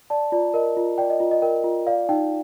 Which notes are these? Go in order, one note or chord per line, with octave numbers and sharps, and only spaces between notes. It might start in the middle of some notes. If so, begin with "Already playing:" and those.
D5 A5
F4 D5
A#4 D#5
F4
D5 G5
D#5
F4 D#5
D#5
A#4 G5
F4
D5 F5
D#4 G5